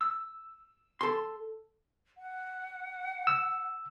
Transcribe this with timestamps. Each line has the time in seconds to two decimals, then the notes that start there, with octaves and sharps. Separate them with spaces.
0.01 E6
1.01 A4 C6
2.17 F#5
3.27 E6